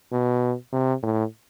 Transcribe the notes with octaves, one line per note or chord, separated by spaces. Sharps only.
B2
C3
A2